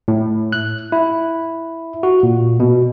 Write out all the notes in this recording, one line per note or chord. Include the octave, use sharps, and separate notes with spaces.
A2
F#6
E4
F#4
A#2
B2